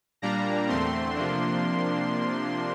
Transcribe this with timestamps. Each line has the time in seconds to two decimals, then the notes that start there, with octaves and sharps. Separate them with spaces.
0.22 A#2 G3 A#3 D4 A#5
0.68 E2 D3 A3 C4 C6
1.15 C3 F3 A#3 D4